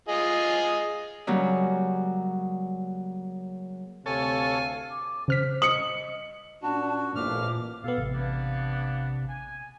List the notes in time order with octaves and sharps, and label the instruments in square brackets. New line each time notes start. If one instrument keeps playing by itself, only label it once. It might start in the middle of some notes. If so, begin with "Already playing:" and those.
[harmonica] F4 G#4 D#5
[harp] C#3 F#3 G3 A#3
[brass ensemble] D2 F5 [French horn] C3 [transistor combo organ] A4 C#5 [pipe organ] G#5
[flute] D6
[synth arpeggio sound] C#3 F6 B6 [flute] C5
[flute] D#5 [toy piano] D#6 [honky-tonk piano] C#7 F#7
[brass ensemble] A#2 C#4 D4 [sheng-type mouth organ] F#4 [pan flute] A5
[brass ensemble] A1 F3 [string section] A#2 [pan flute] D6 [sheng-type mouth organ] F6
[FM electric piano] B2 B3 [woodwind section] A4 F5
[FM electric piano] A1 [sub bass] C3
[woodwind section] A#3 B3 D4
G#5